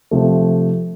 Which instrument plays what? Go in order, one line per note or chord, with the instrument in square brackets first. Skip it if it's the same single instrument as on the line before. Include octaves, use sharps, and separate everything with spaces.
[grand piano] C3 F3 A3